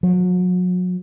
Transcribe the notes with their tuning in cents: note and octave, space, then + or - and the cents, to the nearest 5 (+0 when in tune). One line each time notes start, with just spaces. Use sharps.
F#3 -35